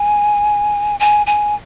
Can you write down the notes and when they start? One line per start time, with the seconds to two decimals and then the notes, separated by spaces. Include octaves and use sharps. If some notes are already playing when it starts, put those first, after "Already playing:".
Already playing: G#5
1.00 G#5
1.27 G#5